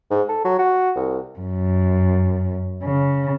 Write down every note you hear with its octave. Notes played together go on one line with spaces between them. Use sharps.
G#2
A4
F#3
F#4
C2
F#2
C#3